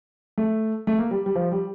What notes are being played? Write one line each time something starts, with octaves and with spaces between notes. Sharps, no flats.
A3
A3
A#3
G3
G3
F3
G3